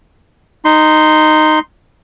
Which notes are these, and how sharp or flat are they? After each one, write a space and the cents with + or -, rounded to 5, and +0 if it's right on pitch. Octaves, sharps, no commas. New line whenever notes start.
D#4 -5 C6 -5